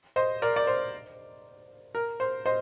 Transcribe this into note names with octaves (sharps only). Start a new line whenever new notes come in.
C5 D#5
A#4 D5
D5
C5
A#4
C5
C5 D#5